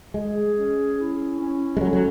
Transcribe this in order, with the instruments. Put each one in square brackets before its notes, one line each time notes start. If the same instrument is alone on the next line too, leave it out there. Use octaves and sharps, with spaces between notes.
[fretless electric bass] G#3 [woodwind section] G#4
[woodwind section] C#4
E4
C#4
[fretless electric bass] G#3
[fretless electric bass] F#3 [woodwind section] A4
[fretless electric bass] F#3